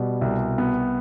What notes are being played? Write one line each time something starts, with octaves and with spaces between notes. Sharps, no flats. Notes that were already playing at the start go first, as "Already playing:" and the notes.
Already playing: B2 G3
C2
B3